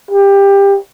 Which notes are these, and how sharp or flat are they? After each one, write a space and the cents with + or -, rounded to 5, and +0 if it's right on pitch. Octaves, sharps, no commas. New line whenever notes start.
G4 +20